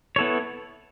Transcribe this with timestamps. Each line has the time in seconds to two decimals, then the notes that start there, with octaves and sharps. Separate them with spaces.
0.16 B3 E4 A4 C#5